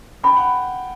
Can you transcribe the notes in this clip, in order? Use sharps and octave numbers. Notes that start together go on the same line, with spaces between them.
G5 B5
F#5